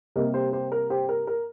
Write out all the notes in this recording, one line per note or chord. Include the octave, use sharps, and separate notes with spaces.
C3 G3 A#3 A#4 D#5
G4 C5
G4 C5
A#4
G4 C5
A#4
A#4